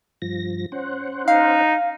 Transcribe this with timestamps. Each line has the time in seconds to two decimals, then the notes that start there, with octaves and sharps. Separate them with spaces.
0.22 G2 F3 A#6
0.72 C#4 C5 F#5
1.28 D#4 F5